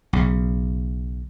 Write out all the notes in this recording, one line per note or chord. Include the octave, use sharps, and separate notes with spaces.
B1 C#3